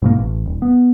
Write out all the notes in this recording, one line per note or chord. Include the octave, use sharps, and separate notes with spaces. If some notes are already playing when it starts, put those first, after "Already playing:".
G#2 B2 A#3
A1
D#1
B3